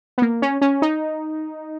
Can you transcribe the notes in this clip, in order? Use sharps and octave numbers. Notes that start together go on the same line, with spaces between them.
B3
A#3
C#4
C#4
D#4